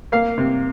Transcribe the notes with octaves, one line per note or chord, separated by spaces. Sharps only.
A#3 F5
C3